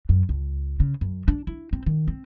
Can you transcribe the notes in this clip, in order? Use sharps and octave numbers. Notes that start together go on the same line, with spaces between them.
F#2
C#2
C#3
F#2
D4
E4
C4
D#3
C4